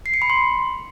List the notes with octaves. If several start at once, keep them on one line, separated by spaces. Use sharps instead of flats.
C7
C#7
B5
C6